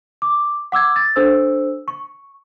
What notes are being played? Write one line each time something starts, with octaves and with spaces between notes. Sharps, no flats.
D6
F#5 D6 E6 G#6
A6
D4 A4 C5 E6
C#6